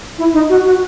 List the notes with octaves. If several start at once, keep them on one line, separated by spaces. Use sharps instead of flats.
E4
D#4
F#4
F#4